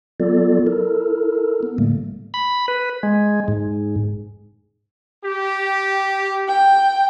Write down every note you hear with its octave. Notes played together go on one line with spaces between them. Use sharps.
F#3 B3 F4 A4 D5
E4 A4 A#4
B3
A2 D3 G3 A3 A#3
B5
B4
G#3
G#2
G4
G5